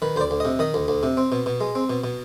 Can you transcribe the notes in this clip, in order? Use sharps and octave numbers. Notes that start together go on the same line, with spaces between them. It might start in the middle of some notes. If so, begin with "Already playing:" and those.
D#3 B4
D2 C5 D5
D2
C3 D#5
D#3 D#5
D2
D2
C3
C4
B2
B2
G#3
C4
B2
B2